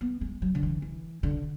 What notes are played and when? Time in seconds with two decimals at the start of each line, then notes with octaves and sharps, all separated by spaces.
0.01 B3
0.21 G#3
0.42 F#3
0.55 D3
0.63 E3
0.82 E3
1.23 D3